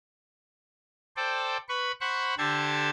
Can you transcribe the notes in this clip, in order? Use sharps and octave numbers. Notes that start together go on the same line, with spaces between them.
A4 C5 D5 G5
B4 B5 C#6
C5 F#5 B5 C#6
D3 G4 A4 C5 A5 G#6